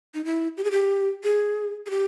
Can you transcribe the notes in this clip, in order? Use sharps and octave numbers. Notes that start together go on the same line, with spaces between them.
D#4
E4
G4
G#4
G4
G#4
G#4
G4